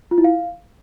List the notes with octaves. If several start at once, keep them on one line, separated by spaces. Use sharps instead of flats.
F4
E4
F5